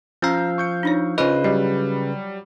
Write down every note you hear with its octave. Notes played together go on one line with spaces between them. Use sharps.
F3 C#4 F5 A#5 E6 G6
C#6 G6 C#7
D4 D#4 C#5
C#3 F4 G#4 B4 C5 D#5
F#3 G3 D#5